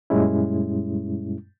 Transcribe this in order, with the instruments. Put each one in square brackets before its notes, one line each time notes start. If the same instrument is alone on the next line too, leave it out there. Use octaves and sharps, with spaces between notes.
[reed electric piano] F#2 A#2 G3 G#3 C#4 E4